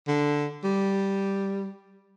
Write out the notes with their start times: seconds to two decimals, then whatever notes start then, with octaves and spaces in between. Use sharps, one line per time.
0.08 D3
0.64 G3